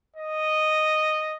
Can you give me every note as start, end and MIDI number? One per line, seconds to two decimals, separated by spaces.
0.16 1.37 75